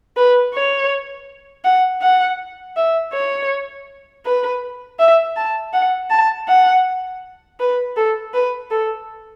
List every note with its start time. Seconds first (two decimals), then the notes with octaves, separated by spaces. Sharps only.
0.17 B4
0.54 C#5
1.65 F#5
2.02 F#5
2.77 E5
3.13 C#5
4.25 B4
4.99 E5
5.37 A5
5.73 F#5
6.10 A5
6.48 F#5
7.60 B4
7.96 A4
8.34 B4
8.71 A4